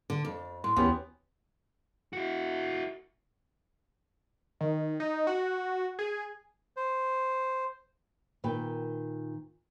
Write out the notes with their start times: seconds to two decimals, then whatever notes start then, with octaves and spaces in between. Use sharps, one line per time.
0.10 D3
0.25 F2
0.64 A2 C6
0.76 D#2 E3 B3 C#4 G4
2.13 E4 F#4
4.61 D#3
5.00 D#4
5.27 F#4
5.99 G#4
6.77 C5
8.44 A#2 D#3 B4 G5